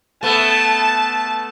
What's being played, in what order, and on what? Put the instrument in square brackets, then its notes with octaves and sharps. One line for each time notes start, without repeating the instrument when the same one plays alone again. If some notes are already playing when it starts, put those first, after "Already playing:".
[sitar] A3 B3 [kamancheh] A5